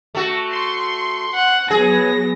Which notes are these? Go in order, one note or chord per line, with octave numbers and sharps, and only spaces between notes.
A3 F#4
C6 C#6
F#5
F#3 B3 G#4 A#6